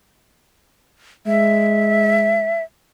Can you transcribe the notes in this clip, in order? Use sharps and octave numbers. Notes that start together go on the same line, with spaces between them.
G#3 E5